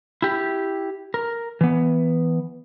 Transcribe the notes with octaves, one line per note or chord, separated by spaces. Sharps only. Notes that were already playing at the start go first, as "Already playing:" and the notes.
E4 G4
A#4
E3 B3